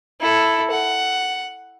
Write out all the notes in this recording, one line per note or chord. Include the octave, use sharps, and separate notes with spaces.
E4 A4
F#5